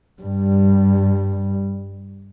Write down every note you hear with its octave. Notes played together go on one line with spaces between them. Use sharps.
G2 G3